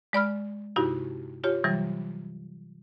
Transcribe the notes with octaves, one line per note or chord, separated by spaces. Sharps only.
G#3 D5 B5 F6
G2 C3 D#4 E4 F#4 G4
F4 G4 C#5
C3 E3 F#3 G3